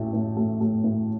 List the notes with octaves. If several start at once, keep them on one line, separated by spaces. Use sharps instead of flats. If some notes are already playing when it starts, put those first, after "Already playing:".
Already playing: A1 A2 A3
A2
A3
A3
A2